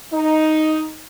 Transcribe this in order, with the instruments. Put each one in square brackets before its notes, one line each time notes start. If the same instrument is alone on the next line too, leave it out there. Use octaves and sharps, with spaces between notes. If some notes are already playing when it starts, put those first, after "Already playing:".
[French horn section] D#4